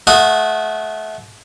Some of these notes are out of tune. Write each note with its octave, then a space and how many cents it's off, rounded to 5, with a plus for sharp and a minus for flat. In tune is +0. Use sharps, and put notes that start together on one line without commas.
A3 -30 F#4 -25 D#6 +0